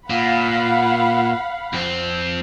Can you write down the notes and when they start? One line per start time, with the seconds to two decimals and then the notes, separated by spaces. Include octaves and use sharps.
0.10 A#2 F5 F#5 B5
1.73 F2 C4